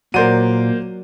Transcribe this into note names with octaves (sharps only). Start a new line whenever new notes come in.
A#2 F#3 A#3 C5 D5 D#7